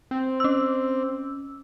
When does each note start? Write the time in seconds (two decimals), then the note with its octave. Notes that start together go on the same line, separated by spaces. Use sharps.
0.11 C4
0.40 C#4 E6